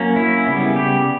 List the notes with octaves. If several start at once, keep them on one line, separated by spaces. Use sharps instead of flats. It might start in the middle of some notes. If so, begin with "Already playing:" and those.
Already playing: F#3 A#3 C#4
E4
C#3 G3 B3
G4